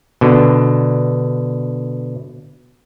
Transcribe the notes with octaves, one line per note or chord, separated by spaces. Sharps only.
B2 D3